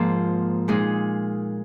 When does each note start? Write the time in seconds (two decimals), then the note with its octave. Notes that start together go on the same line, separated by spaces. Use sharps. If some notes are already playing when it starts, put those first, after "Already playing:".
Already playing: G#2 F3 A#3
0.68 A#2 G#3 D#4 G#4